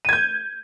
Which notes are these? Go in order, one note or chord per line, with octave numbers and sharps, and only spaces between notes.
G6 G#6 D#7